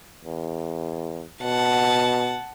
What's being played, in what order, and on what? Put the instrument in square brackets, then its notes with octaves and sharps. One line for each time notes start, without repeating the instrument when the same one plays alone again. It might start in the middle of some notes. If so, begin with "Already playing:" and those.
[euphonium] E2
[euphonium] B2 [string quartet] F#5 A5